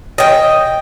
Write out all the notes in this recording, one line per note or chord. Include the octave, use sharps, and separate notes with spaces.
D#5 G5